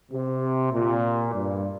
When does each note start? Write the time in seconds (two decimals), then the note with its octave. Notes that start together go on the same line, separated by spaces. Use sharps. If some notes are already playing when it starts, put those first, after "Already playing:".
0.12 C3
0.73 A#2
1.33 G2